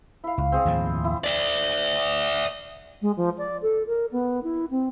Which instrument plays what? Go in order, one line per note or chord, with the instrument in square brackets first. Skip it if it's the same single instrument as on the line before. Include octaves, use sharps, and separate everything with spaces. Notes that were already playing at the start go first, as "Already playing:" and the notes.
[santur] E4 F5
[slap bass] C#2
[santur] C4 G#4 C#5
[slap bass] D#2 A2 F3
[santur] E4
[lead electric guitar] D5 E5
[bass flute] G#3
F3
D5
A4
A#4
B3
E4
C4